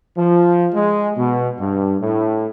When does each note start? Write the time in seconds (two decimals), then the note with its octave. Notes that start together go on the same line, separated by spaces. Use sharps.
0.17 F3
0.74 G#3
1.16 B2
1.59 G2
2.00 A2